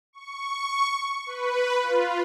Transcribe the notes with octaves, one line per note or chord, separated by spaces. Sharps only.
C#6
B4
F4